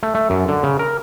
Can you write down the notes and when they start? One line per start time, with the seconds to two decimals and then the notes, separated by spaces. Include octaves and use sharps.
0.03 A3
0.15 A3
0.30 F#2
0.48 D3
0.63 C#3
0.79 A#4